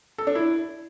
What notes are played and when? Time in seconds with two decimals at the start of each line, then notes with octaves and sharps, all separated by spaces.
0.18 A4
0.27 D4
0.35 E4